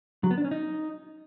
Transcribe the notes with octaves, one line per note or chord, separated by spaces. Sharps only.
F#3
B3
D4
C#4
D#4